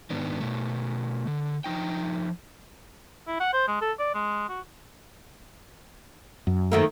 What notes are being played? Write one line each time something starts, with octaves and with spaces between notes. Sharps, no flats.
G#2 D#3 B3 D4
B2 A3
D3
F3 D#4 G5
E4
F#5
C5
G#3
A4
D5
G#3
F#4
F#2
D#3 A3 A#3